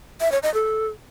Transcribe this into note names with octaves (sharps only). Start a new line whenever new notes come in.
E5
C#5
D#5
A4